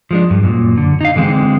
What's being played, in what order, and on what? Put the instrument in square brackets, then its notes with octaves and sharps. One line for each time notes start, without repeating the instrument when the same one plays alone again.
[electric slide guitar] F3 G#3 D4
G2
F#2 A#2
D3
D#4 F5
D3 E3 G#3 C4